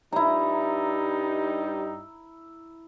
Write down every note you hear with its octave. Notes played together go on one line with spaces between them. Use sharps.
G2 G3 D#4 E4 A#5